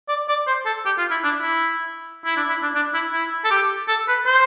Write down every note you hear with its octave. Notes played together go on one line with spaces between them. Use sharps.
D5
D5
C5
A4
G4
F4
E4
D4
E4
E4
D4
E4
D4
D4
E4
E4
A4
G4
A4
B4
C5